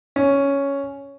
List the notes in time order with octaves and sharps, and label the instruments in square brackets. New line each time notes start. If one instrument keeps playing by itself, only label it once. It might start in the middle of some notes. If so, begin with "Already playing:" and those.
[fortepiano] C#4